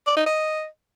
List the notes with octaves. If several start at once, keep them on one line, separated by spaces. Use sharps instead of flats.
D5
D#4
D#5